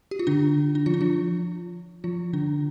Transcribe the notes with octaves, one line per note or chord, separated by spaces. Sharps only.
G4
F4
D3 D4
D4
F3 F4
D4
F3 F4
F3 F4
D3 D4